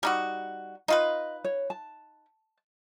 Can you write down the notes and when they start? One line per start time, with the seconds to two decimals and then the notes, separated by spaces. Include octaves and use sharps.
0.03 G3 D#4 F#4
0.88 D#4 F4 B4 D#5
1.44 C#5
1.70 A5